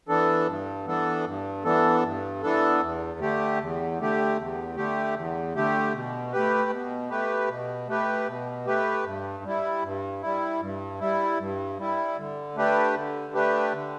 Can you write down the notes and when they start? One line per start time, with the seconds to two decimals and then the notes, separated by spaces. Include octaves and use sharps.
0.08 E3 B3 D4 A4
0.47 G2
0.86 E3 B3 D4 A4
1.25 G2
1.64 E3 B3 D4 A4
2.03 G2
2.43 E3 B3 D4 A4
2.81 E2
3.20 D3 A3 G4
3.60 E2
3.99 D3 A3 G4
4.37 E2
4.76 D3 A3 G4
5.15 E2
5.55 D3 A3 G4
5.94 B2
6.32 A3 G4 B4
6.71 B2
7.10 A3 G4 B4
7.49 B2
7.88 A3 G4 B4
8.27 B2
8.66 A3 G4 B4
9.05 G2
9.44 G3 E4
9.83 G2
10.22 G3 E4
10.60 G2
11.00 G3 E4
11.39 G2
11.79 G3 E4
12.18 D3
12.56 A3 D4 G4 B4
12.95 D3
13.34 A3 D4 G4 B4
13.73 D3